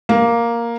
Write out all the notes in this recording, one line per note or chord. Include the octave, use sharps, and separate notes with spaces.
A#3